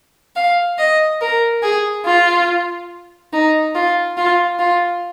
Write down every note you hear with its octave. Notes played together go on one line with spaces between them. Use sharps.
F5
D#5
A#4
G#4
F4
D#4
F4
F4
F4